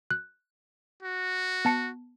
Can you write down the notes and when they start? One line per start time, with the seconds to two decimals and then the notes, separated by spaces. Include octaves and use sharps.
0.11 F#6
1.03 F#4
1.65 B3 A5 C#7